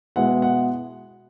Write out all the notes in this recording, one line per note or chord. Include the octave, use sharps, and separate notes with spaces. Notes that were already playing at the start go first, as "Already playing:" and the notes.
B2 G#3 B3 E4 F#5
F#5